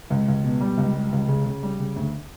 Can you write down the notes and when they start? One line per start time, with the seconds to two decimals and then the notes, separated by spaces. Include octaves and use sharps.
0.10 C#2
0.28 C#2
0.44 B2
0.60 G3
0.77 C#2
0.95 G3
1.12 C#2
1.28 C#3
1.46 C#3
1.63 G3
1.79 C#3
1.96 D2